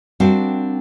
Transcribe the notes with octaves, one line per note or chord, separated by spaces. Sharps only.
G3 C4 D4 F#4 A#4 F5